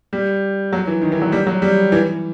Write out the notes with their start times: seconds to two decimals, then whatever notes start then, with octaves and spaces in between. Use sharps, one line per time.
0.13 G3
0.73 F#3
0.87 E3
1.02 D#3
1.12 E3
1.22 F#3
1.32 G3
1.47 F#3
1.62 G3
1.92 E3